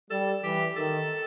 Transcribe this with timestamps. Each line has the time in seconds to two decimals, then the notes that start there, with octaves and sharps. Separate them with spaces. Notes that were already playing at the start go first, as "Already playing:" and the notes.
0.10 G3 A4
0.43 E3 G4
0.76 D#3 A4